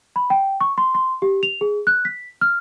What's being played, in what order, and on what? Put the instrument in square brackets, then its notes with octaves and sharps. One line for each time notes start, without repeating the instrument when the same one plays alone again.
[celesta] B5
G5
C#6
C6
C6
G4
F7
G#4
F#6
B6
F6